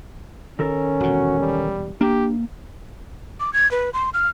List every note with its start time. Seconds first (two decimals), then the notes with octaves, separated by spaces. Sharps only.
0.59 D#3 C#4 A4 A#4
1.00 E1 A#2 F#4
1.39 G3
2.01 A#3 D4 G4
3.40 D6
3.53 G#6
3.71 B4
3.94 C6
4.14 F6